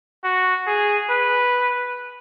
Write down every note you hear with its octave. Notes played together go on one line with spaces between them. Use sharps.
F#4
G#4
B4